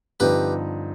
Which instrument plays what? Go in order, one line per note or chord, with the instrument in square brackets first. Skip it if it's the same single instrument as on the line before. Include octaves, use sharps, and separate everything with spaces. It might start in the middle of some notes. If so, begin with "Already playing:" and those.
[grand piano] G2 D3 F3 C4 D#4 [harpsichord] G4 B4